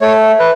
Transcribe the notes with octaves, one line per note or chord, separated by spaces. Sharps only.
A3 C#5
B4